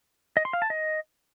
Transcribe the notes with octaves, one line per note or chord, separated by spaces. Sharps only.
D#5
C6
F5
A5
D#5